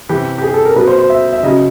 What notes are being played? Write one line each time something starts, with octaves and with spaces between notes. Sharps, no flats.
C3 E3 G4
G4
G#4
A4
A#4
B2 F#3 B4
C5
C5
E5
E5
C#3 F#3 D#5